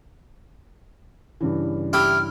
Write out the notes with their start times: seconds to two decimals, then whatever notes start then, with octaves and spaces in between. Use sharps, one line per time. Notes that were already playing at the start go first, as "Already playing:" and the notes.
1.41 G2 C#3 E3
1.93 E4 G4 F6